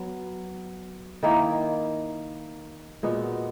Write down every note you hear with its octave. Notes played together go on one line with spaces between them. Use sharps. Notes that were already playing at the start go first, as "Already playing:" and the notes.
Already playing: F#3 B3
D#3 A#3 E4
A#2 G#3 B3 F#4